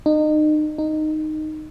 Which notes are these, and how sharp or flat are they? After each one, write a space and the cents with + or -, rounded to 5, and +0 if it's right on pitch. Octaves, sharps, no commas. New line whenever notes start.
D#4 -30
D#4 -10